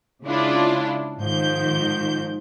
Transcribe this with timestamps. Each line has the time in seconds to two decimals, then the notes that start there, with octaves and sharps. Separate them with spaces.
0.23 C#3 G#3 D4 E4 F4
1.19 G#2 D#3 F3 G6